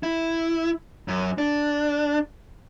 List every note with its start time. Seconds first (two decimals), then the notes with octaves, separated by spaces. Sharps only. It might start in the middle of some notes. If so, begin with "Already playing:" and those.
0.03 E4
1.08 F#2
1.38 D4